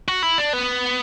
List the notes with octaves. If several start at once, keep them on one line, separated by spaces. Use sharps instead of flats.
F#4
E4
D4
B3